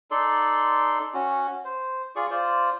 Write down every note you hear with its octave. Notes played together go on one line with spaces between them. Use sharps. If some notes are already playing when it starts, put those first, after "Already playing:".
D#4 A4 D5 C6
C#4 F#4
C5
F4 G#4 D5 C#6
F4 C5 D5